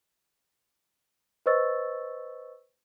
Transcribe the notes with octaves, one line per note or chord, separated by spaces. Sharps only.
B4 C5 D#5 C#6 E6 A6